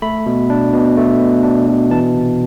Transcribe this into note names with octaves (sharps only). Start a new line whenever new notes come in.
A3 B5
B2
D4
B2
A3
B2
D4
B2
E3 A5
C3